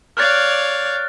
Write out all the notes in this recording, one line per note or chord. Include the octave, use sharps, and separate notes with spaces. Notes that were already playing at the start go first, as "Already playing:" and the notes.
C#5 D5 F5 F6 F#6 A6